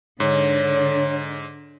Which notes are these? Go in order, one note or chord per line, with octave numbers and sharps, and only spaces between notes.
G#2 D3 C#5